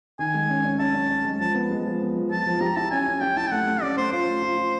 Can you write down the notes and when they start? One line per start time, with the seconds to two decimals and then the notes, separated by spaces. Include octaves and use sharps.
0.19 D#3 G#5
0.34 G#3
0.49 C#4
0.64 C#4
0.79 C#4 A5
0.94 C#4
1.10 C#4
1.24 G#3
1.40 F3 A5
1.55 B3
1.70 G#3
1.85 F3
2.01 B3
2.16 F3
2.31 F3 A5
2.46 F3
2.61 G4 A#5
2.76 E4 A5
2.91 C#4 G#5
3.06 C#4
3.21 G4 G5
3.37 E4 A5
3.47 G5
3.52 A3 F#5
3.67 A3
3.82 C#4 D5
3.97 A3 C5
4.12 F4 C5
4.27 A3
4.43 F4
4.58 F4